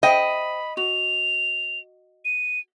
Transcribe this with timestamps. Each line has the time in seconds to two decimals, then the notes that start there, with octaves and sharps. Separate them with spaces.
0.03 C5 D#5 G5 B5
0.77 F#4 F7
2.25 D#7